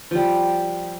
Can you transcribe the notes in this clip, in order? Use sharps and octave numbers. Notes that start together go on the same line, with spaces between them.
F3 G3